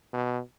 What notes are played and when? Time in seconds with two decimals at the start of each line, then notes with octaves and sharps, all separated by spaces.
0.13 B2